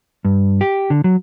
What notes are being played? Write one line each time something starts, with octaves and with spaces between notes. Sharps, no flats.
G2
G4
D3
F#3